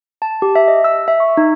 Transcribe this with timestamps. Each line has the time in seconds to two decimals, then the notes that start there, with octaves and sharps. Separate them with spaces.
0.22 A5
0.42 G4
0.55 E5
0.68 D#5
0.84 E6
1.08 E5
1.20 C#6
1.37 D#4